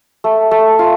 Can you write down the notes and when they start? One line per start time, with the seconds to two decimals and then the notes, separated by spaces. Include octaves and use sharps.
0.24 A3
0.51 A3
0.79 F4